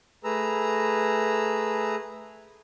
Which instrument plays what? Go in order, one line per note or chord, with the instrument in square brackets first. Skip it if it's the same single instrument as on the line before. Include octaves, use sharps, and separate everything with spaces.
[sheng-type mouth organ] A3 G#4 B4 A#5 E6